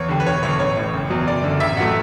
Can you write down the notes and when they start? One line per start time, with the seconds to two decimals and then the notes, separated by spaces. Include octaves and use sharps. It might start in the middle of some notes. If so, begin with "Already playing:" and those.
Already playing: E2 C#5
0.09 D3 G3
0.20 B4
0.26 E1 C#5
0.43 E2 D3 C#5
0.60 A1 C#5
0.77 A2 E3
0.93 F#1
1.10 E2 B2 F#3
1.27 F#1 D5
1.44 F#2 D3
1.60 A1 E5
1.77 G2 F#3 A3 F#5